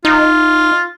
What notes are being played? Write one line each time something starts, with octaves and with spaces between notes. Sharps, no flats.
D#4 F4